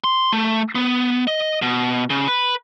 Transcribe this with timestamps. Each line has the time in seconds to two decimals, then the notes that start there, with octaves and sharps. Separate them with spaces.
0.04 C6
0.33 A3
0.75 B3
1.27 D#5
1.62 B2
2.10 C#3
2.28 B4